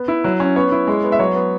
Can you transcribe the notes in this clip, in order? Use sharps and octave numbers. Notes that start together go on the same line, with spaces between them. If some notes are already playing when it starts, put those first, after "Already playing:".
Already playing: B3
E4
F#3
C#4
B3 C#5
E4
G#3
B3
E5
F#3 C#5
B3